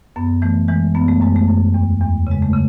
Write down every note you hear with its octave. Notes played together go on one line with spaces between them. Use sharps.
F#2 B3
E3 A3
E3 G#3
F#2 B3
A3
F#2 G#3
A3
F#2
E2
E2
C#3 G#3
A3
C#3